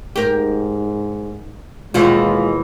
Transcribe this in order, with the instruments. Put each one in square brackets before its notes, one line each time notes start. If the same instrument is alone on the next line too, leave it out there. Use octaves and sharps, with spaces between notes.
[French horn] G#2 [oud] G4 A#4
[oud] D#2 B2 E3 [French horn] G#3 [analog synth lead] F4